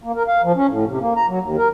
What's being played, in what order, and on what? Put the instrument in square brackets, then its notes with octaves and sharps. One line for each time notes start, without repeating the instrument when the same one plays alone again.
[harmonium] A#3
A#4
F5
F3
C#4
A2
C3
A#3
A#5
F#3
D#2
A#4